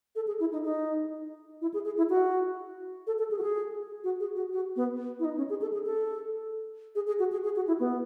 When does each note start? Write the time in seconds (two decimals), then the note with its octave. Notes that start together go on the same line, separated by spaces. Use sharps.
0.16 A4
0.27 G#4
0.40 E4
0.52 D#4
0.64 D#4
1.61 E4
1.74 G#4
1.85 G#4
1.97 E4
2.09 F#4
3.07 A4
3.19 A4
3.31 G#4
3.39 F#4
3.42 G#4
4.04 F#4
4.20 G#4
4.36 F#4
4.53 F#4
4.76 B3
5.19 E4
5.25 D#4
5.37 C#4
5.50 G#4
5.61 A4
5.73 G#4
5.86 A4
6.95 G#4
7.07 G#4
7.19 F#4
7.32 G#4
7.44 G#4
7.56 F#4
7.67 E4
7.80 B3